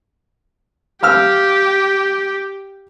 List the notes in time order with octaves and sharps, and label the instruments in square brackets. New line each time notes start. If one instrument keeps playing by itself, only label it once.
[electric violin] G4 [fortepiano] F5 E6 F6